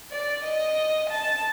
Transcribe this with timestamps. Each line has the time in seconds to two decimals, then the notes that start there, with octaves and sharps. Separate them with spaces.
0.11 D5
0.44 D#5
1.10 A5